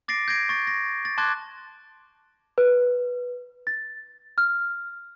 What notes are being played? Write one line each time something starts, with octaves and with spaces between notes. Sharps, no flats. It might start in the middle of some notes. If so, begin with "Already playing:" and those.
D6 A6 A#6 C7 D7
G6 G#6 A#6 C7 D7
C#6 A6
A#6
A6
A5 C6 D6 F#6 G#6 A6
B4
A6
F6